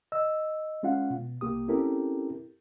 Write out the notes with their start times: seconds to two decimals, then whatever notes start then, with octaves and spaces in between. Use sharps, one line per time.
0.12 D#5 E6
0.83 G#3 C#4 F4 F5 F#5
1.10 B2
1.41 C2 A#3 G4 D#6
1.68 C4 C#4 E4 G4 A4 A#4